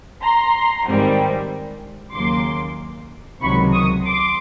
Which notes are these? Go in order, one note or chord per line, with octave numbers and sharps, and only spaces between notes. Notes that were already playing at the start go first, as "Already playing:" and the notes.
A#5 C6
G#2 D#3 G3 C4
D#2 C#3 F#3 A#3 C6 D6
C#2 C3 D#3 F#3 B5 C#6
C#6 D#6
C6 D6